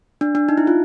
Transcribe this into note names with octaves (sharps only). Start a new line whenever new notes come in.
D4
D4
D#4
E4
F4